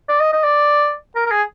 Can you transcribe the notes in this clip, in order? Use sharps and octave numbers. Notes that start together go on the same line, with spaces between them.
D5
D#5
D#5
D5
A#4
A#4
G#4